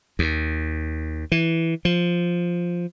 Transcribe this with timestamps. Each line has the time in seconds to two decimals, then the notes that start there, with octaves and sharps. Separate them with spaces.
0.19 D#2
1.32 E3
1.85 F3